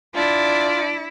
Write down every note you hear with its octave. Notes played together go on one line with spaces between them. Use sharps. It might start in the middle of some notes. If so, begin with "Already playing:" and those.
D4 E4 F4 D5